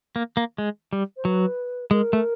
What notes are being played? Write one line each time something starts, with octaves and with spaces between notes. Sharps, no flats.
A#3
A#3
G#3
G3
C5
F#3 B4
G#3 A#4
A3